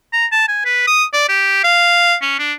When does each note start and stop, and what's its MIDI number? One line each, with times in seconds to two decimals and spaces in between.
0.13 0.26 82
0.32 0.47 81
0.48 0.64 80
0.65 0.87 71
0.87 1.04 87
1.13 1.24 74
1.28 1.59 67
1.64 2.15 77
2.22 2.36 61
2.39 2.53 62